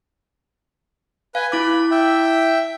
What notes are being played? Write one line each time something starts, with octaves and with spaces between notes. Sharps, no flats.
B4 F5 G#5
E4 B5 D6
E5 G5